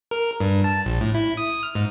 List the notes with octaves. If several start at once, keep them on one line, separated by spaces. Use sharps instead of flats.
A#4
G2
A5
A#1
A2
E4
D#6
F6
G#2